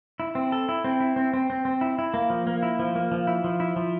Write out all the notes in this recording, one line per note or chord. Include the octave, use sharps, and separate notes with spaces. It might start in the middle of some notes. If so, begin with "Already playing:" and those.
E4
C4
A4
E4
C4
E4
C4
C4
C4
C4
E4
E4
A#3
F3
A#3
E4
F3
A#3
F3
E4
F3
E4
F3